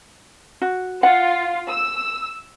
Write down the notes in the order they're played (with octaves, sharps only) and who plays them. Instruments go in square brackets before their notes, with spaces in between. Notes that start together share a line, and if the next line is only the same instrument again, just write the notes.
[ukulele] F#4
[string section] F4 [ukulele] F#5
[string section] E6